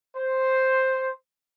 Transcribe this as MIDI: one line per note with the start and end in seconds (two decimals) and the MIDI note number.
0.16 1.09 72